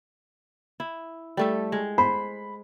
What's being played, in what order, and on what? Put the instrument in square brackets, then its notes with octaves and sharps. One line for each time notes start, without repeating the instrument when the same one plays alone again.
[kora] E4
G3 A3 A4
G#3
[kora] C5 [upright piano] B5